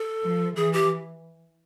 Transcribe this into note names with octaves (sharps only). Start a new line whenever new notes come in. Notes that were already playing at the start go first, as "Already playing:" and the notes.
Already playing: A4
F3
E3 G#4
G4